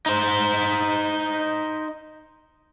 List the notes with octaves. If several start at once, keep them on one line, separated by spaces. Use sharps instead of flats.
D#4 C5